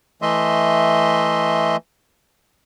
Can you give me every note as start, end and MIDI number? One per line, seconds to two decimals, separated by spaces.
0.22 1.76 52
0.22 1.76 57
0.22 1.76 75
0.22 1.76 76
0.22 1.76 84